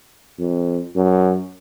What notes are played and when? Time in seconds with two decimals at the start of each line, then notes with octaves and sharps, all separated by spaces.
0.39 F2
0.96 F#2